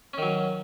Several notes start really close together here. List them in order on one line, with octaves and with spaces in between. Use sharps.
C#4 D#3 F#3